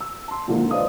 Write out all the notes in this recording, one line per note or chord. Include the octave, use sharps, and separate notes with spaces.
E6
A5 C6
A#2 D3 D#3 F3 G#3 A#3
B4 C5 D5 D#5 F5 D#6